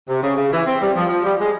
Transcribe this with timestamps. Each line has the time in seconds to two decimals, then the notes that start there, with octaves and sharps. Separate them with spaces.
0.09 C3
0.22 C#3
0.37 C#3
0.53 E3
0.66 C4
0.80 G3
0.96 F3
1.09 F3
1.24 G3
1.39 G#3